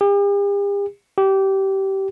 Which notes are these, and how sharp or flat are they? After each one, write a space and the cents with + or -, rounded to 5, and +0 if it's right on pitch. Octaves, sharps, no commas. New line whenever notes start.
G4 +45
G4 -20